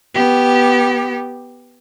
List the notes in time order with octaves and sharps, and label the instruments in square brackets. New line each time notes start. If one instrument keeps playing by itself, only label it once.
[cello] B3 G4